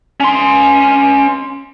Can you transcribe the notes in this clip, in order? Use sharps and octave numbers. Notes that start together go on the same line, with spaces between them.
C#4 C6